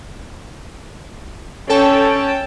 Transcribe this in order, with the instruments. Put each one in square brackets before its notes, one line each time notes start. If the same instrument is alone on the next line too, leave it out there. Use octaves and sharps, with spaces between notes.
[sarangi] C#4 [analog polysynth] A4 G5 A5